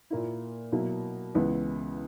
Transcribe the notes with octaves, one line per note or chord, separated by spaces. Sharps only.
A#2 A#3 E4
B2 F#3 A#3 E4
C#2 C#3 E3 B3